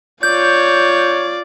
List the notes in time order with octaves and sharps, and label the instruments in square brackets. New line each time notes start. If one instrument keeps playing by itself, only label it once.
[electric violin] F4 D5 [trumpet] C#5 [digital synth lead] G6